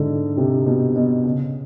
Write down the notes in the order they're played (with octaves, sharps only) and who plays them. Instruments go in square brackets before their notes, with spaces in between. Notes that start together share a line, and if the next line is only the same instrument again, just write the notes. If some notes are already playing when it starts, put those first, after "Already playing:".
Already playing: [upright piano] G#2 D3
C3
B2
B2
C#3